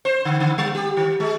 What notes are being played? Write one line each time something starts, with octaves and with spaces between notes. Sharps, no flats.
C5
D3
D3
G3
G4
D#3
G#3